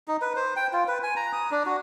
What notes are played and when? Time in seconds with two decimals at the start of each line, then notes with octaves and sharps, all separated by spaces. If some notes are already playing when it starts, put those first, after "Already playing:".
0.08 D#4
0.22 B4
0.36 C5
0.56 G5
0.73 F4
0.88 B4
1.03 G#5
1.16 A#5
1.33 D#6
1.51 D4
1.66 F#4